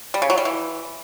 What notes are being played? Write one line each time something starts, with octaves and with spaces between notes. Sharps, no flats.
G3
C#3
F#3
G3
E3